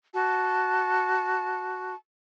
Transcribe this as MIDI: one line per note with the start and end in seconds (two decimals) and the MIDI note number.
0.13 1.94 66
0.13 1.94 81